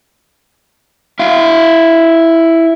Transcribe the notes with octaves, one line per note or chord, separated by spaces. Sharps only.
E4 F5